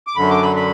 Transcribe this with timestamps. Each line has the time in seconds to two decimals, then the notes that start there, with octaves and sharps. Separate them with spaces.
0.07 D6
0.16 F#2 D3 F#3 B5
0.30 D6
0.43 B5
0.56 B5